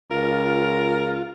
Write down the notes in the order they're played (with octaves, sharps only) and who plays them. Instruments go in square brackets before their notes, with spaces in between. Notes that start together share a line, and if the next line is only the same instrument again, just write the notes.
[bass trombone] C#2 [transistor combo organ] F4 [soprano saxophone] A#4